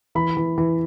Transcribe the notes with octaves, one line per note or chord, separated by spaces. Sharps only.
E3 B5
E3
E3